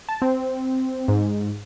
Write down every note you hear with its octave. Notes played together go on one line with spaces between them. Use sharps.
A5
C4
G#2